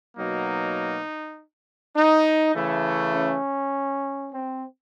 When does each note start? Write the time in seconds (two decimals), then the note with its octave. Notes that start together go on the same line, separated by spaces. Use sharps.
0.17 B2 F#3 A#3 D#4
1.96 D#4
2.55 C#3 E3 A3
3.14 C#4
4.33 C4